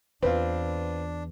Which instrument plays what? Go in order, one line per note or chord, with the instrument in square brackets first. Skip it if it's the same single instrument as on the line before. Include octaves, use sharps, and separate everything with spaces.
[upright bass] E2 [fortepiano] C4 F4 [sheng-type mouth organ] D4 [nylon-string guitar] B4